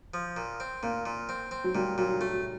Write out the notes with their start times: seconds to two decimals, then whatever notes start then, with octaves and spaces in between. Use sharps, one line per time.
0.14 F3
0.37 A#2
0.60 C4
0.83 A#2 A#3
1.06 A#2
1.29 C4
1.51 C4
1.64 F#3
1.75 A#2 G3
1.98 A#2 F#3
2.21 F#3 A3